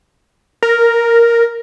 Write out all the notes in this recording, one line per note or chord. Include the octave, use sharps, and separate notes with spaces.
A#4